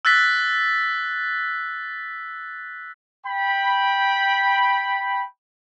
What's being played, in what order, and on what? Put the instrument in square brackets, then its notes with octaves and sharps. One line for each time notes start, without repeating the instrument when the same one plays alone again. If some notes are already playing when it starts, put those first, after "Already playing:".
[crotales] E6 F#6 A6 B6
[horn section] G5 B5